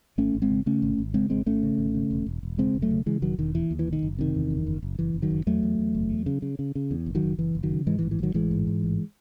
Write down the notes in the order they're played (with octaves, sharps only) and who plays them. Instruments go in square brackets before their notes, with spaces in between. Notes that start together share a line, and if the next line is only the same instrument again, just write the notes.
[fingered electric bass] G#1 A3 C#4
G#1
G#3 C4
C#3
C#3 A3 C#4
G#1
G#1
C#3 G#3 C4
G#1 G#3 C4
G#1 A3 C#4
C#3
G#1
C#3
E1
E1
E1
C#3 G#3 C4
E1
F#3 A3
C#3
C#3 E3 G#3
E1 D#3 F#3
E1 D#3
D#2 E3
D#2
E3
E1
D#3
F#1
C3 D#3
E2
F#1
F#1
F#1
F#1 E3
F#1
D#3 F#3
F#1
E2 F#3 A3
E2
E2
F#1
E2
C#3
C#3
C#3
C#3
E2
F#1
D#3 F#3
F#1
F#1 E3
F#1
D#3 F#3
C#3
G#2 E3 G#3
E3
A1
E3
A1 D#3 F#3
A1 E3 G#3
G#2
G#2
A1